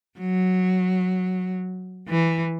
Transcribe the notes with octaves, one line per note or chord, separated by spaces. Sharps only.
F#3
E3